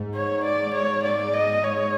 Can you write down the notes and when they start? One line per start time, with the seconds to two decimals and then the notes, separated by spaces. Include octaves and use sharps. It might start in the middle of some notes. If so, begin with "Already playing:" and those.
Already playing: G#2
0.15 C#5
0.45 D5
0.74 C#5
1.04 D5
1.34 D#5
1.64 C#5